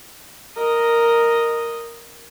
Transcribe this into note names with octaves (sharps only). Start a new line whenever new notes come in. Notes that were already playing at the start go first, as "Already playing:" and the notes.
A#4 D#5